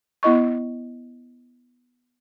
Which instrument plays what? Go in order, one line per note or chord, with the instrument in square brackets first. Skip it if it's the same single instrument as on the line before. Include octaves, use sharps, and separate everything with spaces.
[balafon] B3 E4 D#5 C#6